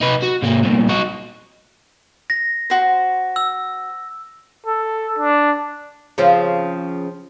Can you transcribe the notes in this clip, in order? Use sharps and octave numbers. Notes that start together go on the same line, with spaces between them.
D#4 B4
F#4
G#2 A#3
C2 A#2
D#4 F#4
A#6
F#4 C5
E6
A4
D4
C#3 F3 C4